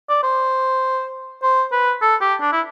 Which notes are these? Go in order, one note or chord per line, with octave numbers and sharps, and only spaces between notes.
D5
C5
C5
B4
A4
G4
D4
E4